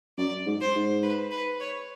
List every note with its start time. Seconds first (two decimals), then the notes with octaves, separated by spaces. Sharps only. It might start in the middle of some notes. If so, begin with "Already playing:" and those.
0.18 F#2 D5
0.46 G#2
0.61 C5
0.75 G#2
1.03 B4
1.31 B4
1.60 C#5